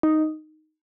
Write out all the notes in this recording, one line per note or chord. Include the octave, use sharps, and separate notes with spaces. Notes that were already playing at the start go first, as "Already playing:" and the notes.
D#4